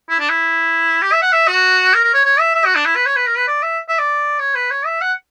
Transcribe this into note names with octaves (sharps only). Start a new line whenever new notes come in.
E4
D4
E4
G4
E5
F#5
E5
F#4
A#4
A#4
C#5
C#5
E5
E5
F#4
D4
E4
B4
C#5
B4
A#4
B4
D5
E5
E5
D5
C#5
B4
C#5
E5
F#5